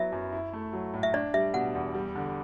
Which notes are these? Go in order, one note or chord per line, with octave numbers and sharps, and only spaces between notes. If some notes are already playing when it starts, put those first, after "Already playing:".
Already playing: F#3 B3 E4 E5
F#2
E4
A3
F#3
A2
E5
D4 D5
G3 E5
B2 F#5
E2
G3
D3